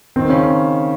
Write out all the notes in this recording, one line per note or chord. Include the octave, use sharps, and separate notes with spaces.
D#3 C4
C#3 C#4